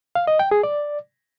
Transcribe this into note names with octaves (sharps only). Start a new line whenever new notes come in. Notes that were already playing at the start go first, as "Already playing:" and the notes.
F5
D#5
G5
G#4
D5